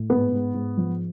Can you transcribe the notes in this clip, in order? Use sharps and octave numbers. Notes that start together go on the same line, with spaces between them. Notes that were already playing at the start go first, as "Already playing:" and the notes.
Already playing: A2
G#2 B3
G#2
G#2
F3